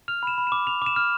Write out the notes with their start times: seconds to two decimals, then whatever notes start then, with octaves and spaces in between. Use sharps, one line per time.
0.08 F6 F7
0.23 B5 E7
0.38 B5
0.47 D6 E7
0.67 D6 F7
0.82 D6 E7
0.96 F6